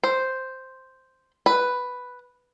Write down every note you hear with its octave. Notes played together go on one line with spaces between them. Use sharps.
C5
B4